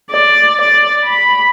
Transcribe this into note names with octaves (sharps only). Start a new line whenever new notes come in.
D5
D5
B5